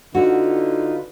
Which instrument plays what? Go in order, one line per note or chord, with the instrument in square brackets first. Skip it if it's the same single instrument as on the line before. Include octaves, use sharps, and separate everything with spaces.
[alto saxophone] D3 [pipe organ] D#4 F4 B4 [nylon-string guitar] F#4